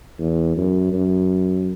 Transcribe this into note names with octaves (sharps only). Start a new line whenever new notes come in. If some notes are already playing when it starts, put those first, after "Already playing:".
E2
F#2
F#2